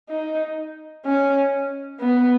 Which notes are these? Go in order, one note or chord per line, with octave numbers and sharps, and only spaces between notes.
D#4
C#4
B3